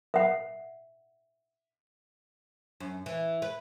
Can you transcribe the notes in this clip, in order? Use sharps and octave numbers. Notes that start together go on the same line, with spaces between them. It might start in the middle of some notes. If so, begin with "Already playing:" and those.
E5 F#5
F#2
E3
B4